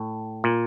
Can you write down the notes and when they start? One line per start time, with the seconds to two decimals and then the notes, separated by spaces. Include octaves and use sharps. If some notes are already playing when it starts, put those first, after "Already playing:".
Already playing: A2
0.44 A#2